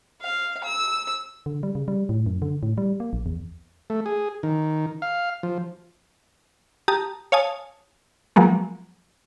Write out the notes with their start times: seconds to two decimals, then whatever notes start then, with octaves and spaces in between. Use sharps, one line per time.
0.21 F5
0.64 E6
1.46 D3
1.63 G3
1.75 C#3
1.88 G3
2.09 A2
2.26 F#2
2.42 D3
2.63 A2
2.78 G3
3.00 A#3
3.13 A#1
3.26 E2
3.90 A3
4.06 G#4
4.43 D#3
5.02 F5
5.43 F3
6.88 G4 A5 A#5 D#6
7.32 C#5 F5 G#5 A5 D#6
8.36 F3 F#3 G#3 A#3 B3